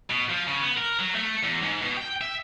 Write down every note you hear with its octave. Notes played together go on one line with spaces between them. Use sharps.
B2
F3
C#3
B3
A#4
F#3
A3
E2
G#2
B2
G5
E5